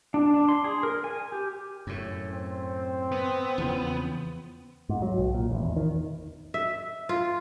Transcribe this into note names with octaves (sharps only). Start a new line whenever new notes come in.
D4
D4
C6
G#4
A#4
G#5
G4
F#2 A2
C4
B3
E2 C#3 F3
G#2
F#3
B1
A#2
A1
E2
D#3
E5
F4